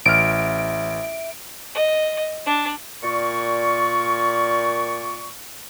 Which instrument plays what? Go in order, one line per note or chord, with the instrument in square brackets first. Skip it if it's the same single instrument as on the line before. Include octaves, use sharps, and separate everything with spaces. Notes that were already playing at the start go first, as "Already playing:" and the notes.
[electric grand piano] A1 F6 [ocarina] E5 [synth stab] D7
[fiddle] D#5
D4
[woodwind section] A#2 D5 C#6